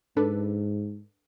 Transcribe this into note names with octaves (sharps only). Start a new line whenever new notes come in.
G#2 D4 A4 B4